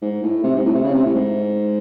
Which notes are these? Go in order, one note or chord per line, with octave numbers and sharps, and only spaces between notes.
G#2
A2
C3
G#2
A2
C3
C#3
C3
A2
G#2